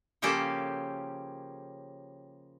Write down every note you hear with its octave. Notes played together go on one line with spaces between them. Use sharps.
C#3 F3 A#3 C#4 G4 A4